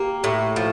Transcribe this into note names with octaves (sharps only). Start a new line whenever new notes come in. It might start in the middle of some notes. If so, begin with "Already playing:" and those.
Already playing: A#3 G4
A2
F3